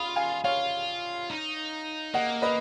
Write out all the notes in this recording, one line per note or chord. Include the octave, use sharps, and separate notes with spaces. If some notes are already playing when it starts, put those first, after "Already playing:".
Already playing: F4 B5 D#6
F5 G#5
F4 C#5 F5
D#4
A#3 D#5 F#5
B4 D#5